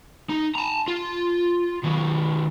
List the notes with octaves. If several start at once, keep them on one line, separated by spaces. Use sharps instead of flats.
D#4
A5 A#5
F4
D#3 F#3